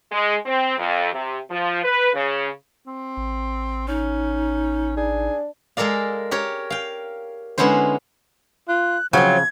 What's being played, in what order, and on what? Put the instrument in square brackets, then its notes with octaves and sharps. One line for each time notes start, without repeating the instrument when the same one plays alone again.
[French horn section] G#3
C4
F2
C3
F3
B4
C#3
[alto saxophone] C4
[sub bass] A1
[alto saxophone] C#4 [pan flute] D#4
[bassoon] D4 [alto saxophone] G#4
[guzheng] G#3 A4 A#4 D5 F5
G4 A#4 C#5
F5 G5
D3 G#3 B3 C#4 E4 C5
[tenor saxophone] F4 [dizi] F#6
[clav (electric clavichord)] C#3 [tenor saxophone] F3 [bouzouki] F#3 A3 C4 [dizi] G#6